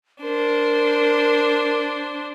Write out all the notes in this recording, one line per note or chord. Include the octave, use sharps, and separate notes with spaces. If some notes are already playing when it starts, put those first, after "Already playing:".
D4 A#4 C5